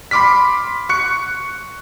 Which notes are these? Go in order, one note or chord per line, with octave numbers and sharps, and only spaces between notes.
B5 C6 D6 F6 B6
C#6 F#6 C#7